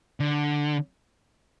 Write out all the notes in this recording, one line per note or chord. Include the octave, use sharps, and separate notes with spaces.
D3